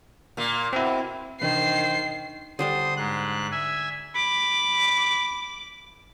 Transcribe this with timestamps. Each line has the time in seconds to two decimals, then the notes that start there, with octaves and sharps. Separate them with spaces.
0.37 A#2 A#3
0.73 B2 C4 E4
1.41 C3 D#3 E3 D4 C5 C7
2.59 D3 G3 D4 C5 C6 D#6
2.97 G#2 F#6
3.52 E5 G#5
4.16 B5 D6